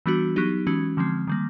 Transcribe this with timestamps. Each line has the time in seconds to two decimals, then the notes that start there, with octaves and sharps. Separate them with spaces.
0.06 E3 G3 B3 D4 F#4
0.36 F#3 B3 D#4 G4
0.67 E3 G#3 C#4 F#4
0.97 D3 F3 G#3 C4
1.28 D#3 G3 A#3